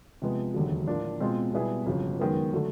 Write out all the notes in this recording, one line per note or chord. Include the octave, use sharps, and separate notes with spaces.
C3 F3 G#3 B3
E1 D#2 D3 F#3
A2 F3 A#3 D4 F4
B2 G#3 C4 F4
B2 G3 B3 E4 G#4
G1 F2 C#3 F#3
F#2 D#3 G#3 B3
D3 F#3 A3